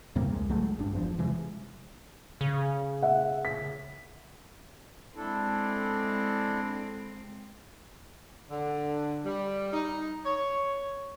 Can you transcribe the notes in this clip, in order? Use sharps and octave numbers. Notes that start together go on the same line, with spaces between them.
E2 C3 G3 A#3
C#2 G#3
C#2 F#3 G#3 A3
G1 G2 D4
E1 E2 F3
C3 E3 G#3
C#3
E5 F#5
B6
G#3 C4 D4 E4 A4
D3
G3
D#4
C#5